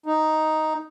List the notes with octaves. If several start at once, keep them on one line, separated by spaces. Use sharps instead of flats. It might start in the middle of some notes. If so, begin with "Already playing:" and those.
D#4